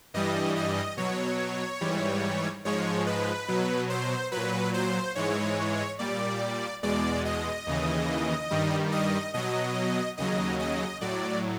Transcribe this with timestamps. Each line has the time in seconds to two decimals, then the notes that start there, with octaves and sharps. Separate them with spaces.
0.14 G2 E3 G3 D#5
0.56 D#5
0.97 B2 F#3 C#5
1.81 G#2 E3 G3
2.65 G#2 F3 G#3 C#5
3.07 B4
3.48 B2 F#3
3.90 C5
4.32 A#2 F#3 B4
4.74 C5
5.15 G#2 E3 G#3 C#5
5.99 A#2 G3 D5
6.83 E2 B2 G#3 D5
7.25 D#5
7.67 D#2 C#3 E3
8.51 G2 D#3 G3
8.92 D#5
9.34 B2 F#3 D#5
10.18 D#2 C#3 F#3 D#5
10.60 D#5
11.01 A2 F#3 D5